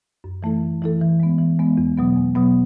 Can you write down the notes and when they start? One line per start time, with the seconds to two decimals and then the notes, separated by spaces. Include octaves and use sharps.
0.24 F#2
0.43 E3 A3 E4 A4
0.63 F#2
0.82 E3 A3 E4 A4
1.01 E3
1.20 G#3 B3
1.39 E3
1.59 G#3 B3
1.77 E2
1.97 B2 F#3 B3
2.16 E2
2.35 B2 F#3 B3